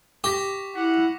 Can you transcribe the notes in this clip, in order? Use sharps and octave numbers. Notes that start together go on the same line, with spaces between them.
G4 C#6 A#6 B6
E4 F#5 D6 B6